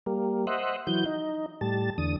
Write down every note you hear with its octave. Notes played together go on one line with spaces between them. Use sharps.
G3 A#3
C5 D#5 E5 F#5
E3 F#3 G6
D#4
A2 G3 A5
E2 D3 D#6